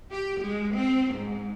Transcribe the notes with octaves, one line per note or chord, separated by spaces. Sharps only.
G4
G#3
C4
G#2